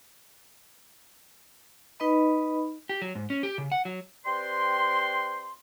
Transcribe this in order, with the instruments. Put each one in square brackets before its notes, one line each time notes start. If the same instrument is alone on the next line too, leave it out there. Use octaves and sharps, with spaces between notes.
[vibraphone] D#4 B4 D#5 B5
[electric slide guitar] G4
F#3
G#2
C#4
G4
C#3
F#5
F#3
[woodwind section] C4 G4 B4 D5 G5 C6